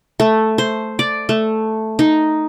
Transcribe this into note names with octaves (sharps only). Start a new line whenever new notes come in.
A3
C5
D5
A3
D#4